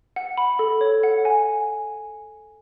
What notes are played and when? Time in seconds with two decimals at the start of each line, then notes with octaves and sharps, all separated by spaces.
0.16 F#5
0.37 B5
0.59 A4
0.81 C#5
1.03 F#5
1.25 G#5